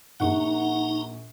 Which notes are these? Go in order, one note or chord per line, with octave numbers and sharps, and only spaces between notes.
A#1 A#2 D#4 F#5 A#5 C#6